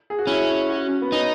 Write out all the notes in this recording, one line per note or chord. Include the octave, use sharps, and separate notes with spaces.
G#4
F#4
C#4 E4
F#4
B3
C#4 D#4